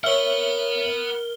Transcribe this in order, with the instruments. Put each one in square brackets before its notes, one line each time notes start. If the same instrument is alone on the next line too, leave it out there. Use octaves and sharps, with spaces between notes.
[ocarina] A#4 [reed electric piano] C#5 E5 [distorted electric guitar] F#5 B5 [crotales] F6 G7